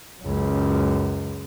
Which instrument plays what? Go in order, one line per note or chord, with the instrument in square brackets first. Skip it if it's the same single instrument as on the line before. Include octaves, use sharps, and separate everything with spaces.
[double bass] C#2 F#2